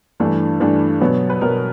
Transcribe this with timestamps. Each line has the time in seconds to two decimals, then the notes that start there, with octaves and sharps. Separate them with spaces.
0.20 G2 E3 A3 D4
0.60 G2 E3 A3 D4
1.01 B2 F#3 B3
1.30 B4
1.41 B2 F#3 B3 A#4